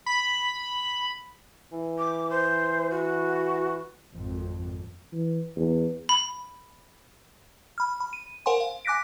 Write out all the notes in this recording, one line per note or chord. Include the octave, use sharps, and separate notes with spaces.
B5
E3
D6
C5
F#4
G#1 F2
E3
E2
B5
B5 F6
B5
D#7
A#4 C5 F5 F#5 G#5 C6
F5
G#5 D6 F#6 A#6 B6 D7